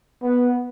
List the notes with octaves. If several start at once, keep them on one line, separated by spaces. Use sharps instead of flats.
B3